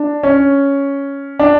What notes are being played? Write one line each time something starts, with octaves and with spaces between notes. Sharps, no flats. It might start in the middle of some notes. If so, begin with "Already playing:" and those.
Already playing: D4
C#4
D4